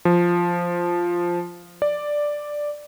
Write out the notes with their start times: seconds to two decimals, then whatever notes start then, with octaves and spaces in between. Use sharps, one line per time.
0.05 F3
1.82 D5